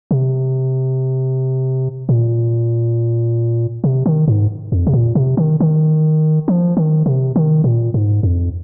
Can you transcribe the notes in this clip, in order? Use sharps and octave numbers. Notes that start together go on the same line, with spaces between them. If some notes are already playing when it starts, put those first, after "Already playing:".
C3
A#2
C3
D#3
G#2
F2
C3
A#2
C3
D#3
D#3
F3
D#3
C3
D#3
A#2
G#2
F2